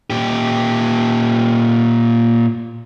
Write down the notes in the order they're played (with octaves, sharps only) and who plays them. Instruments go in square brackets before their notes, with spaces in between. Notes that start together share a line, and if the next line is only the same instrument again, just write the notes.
[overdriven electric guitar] A#2 G4